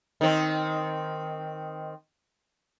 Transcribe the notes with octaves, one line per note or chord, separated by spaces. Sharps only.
D#3 C4